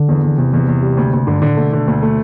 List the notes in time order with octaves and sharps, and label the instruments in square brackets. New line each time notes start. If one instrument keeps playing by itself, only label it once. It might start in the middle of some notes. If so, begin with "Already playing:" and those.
Already playing: [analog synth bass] D3
[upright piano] E2
E2
[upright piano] E2 [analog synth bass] C3
[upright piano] E2
E2
G3
D2
D2
[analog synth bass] G2 [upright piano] D3
[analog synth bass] A2 [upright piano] D3
[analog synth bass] B2 [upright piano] A3
[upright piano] D3
D2
A3